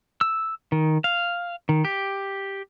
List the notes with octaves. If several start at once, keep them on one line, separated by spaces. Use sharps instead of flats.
E6
D#3
F5
D#3
G4